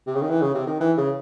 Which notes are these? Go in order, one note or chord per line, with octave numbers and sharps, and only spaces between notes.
C3
C#3
D#3
E3
C#3
C3
D#3
E3
C#3